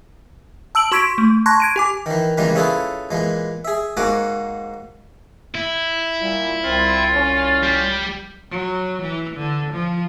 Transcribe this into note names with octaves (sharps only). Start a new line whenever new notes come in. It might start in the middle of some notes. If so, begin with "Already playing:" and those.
A5 E6 D7 F#7
F#4 C6 C#6 G#6 B6 D7
A3
A5 C6 C#6 F#6 G#6 A#6
G#6 D7 D#7
G4 G#5 D6
D#3 E3
C#3 E3 G3 G#3 A#3 F4
C#4 E4 F4 G#4 A4 B4
A#2 E3 G#3
G#4 E5
G#2 A#3 F#4 F#5 G#5 D6
E4
A#2 G3 F4
C2 C4 F4
C#4
G3
F#3
E3
D3
F3